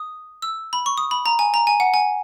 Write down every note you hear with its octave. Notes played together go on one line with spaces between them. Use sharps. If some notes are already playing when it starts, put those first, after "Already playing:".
Already playing: D#6
E6
B5
C#6
D#6
B5
A#5
G#5
A#5
G#5
F#5
G#5